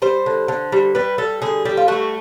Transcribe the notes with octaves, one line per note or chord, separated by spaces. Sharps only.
G3 C5
D3
D3
G3
G3 B4
G3 A4
D3 G#4
G3 G4
F4
A3 F#4